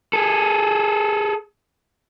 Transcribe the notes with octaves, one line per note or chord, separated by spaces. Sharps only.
G#4 A4